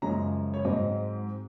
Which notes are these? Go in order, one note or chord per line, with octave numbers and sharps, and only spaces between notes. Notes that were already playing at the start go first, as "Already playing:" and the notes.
F#2 C#3 F3 G#3 C#4 A#5
C#5
G#2 F#3 C4 D#5